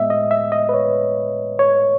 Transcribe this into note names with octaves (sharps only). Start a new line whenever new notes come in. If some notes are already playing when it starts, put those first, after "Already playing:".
Already playing: A2 G#3 B3 D#5 E5
D#5
E5
D#5
B4
C#5
C#5